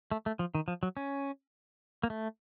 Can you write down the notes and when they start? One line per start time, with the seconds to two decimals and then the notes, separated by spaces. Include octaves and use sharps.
0.12 A3
0.26 A3
0.39 F3
0.55 D#3
0.68 F3
0.83 F#3
0.97 C#4
2.03 A#3
2.10 A3